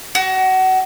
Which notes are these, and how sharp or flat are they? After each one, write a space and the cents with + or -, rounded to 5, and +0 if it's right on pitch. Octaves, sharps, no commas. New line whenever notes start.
F#4 +25